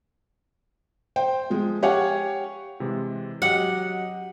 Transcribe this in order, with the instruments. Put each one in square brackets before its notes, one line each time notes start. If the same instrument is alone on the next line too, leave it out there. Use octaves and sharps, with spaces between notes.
[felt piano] C5 G5
F3 G#3
G4 C#5 F5 F#5 G#5
[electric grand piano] C3 E3 G#3
[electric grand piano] F#3 G4 D#5 [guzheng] F#5